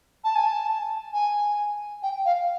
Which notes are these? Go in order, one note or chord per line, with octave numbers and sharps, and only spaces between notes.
A5
G#5
A5
G#5
G5
F5